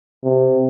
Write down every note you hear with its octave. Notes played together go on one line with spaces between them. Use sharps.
C3